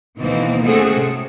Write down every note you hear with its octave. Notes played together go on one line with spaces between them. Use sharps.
D2 B2 D#3 E3 A#3 C4
A3 C4 C#4 F#4 G#4 A4
C3